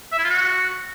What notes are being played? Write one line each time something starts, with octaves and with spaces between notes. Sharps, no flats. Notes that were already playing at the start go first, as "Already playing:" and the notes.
E5
E4
F4
F#4